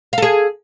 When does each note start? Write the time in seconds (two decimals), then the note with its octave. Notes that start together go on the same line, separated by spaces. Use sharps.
0.13 F5
0.18 A4
0.22 G#4